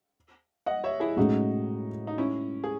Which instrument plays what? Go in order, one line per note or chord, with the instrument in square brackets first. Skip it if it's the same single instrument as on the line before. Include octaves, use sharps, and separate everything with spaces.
[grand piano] D#5 F#5
C#5 E5
E4 G#4
[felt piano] A2 G#3 C#4 G#4 [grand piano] D#4 F#4
[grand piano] D#4
C#4 E4
G#4